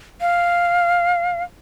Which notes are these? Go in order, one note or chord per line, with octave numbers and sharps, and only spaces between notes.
F5